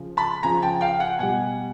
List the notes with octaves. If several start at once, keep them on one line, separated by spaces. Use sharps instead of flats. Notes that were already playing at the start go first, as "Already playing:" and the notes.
Already playing: C#3 F3
A5 B5
C#3 F3 G#5 A#5
G5 A5
F5 G5
F#5 G#5
B2 G3 F#5 G#5